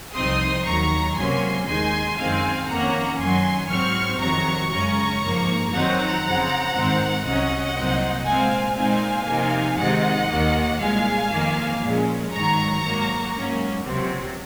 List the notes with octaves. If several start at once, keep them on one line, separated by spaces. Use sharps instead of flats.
C2 C3 F3 C4 D#4 C6 D#6
D#2 D#3 F#3 A#5 C#6
C#2 C3 F#3 A#3 C#4 G#5 C6
D#2 D#3 G#3 D#4 G#5 C6
F#2 D#3 G#3 C4 D#4 F5 G#5
F2 D#3 A#3 C#4 F#5 A#5
F#2 D#3 F#3 G#5 C6
G#2 F#3 C4 C#6 F6
F2 C3 D#3 F#3 A#5 C#6
F#2 C#3 G#3 C#4 A#5 C#6
G#2 F3 A#3
F2 D#3 F#3 C4 D#4 F#5 A#5
F2 C#3 F3 C4
G#2 D#3 G#3 C4
C2 C3 F#3 C#4 D#5 F#5
C2 A#2 F#3 C4 D#4
A#2 G#3 C4 F5 G#5
A#2 G#3 C4 D#4 F5 G#5
C3 F3 A#3 D#4
C3 D#3 G#3 D#4 D#5 F#5
D#2 D#3 A#3
C2 A#2 G#3 F5 G#5
F2 D#3 A#3
A#2 F3 G#3 C#4
G#2 D#3 F#3 A#5 C#6
G#2 F#3 A#3
G#2 F#3 A#3 C#4
C#2 C3 F#3 C4